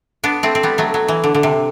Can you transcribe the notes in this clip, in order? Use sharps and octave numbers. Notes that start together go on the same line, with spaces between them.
B3 D4
A3 C4
C4
G3 B3
F#3 A3
F#3
E3
D3
D3
C3